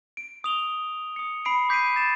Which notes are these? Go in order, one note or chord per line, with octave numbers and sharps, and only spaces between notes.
D7
D#6 F7 G7
D#6 C#7
B5 C7 D7
D6 G6 B6 C7 D7 D#7
A6 E7